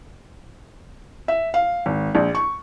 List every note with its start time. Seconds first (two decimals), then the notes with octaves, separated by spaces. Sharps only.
1.28 E5
1.54 F5
1.86 G#1
2.15 A#1
2.35 C#6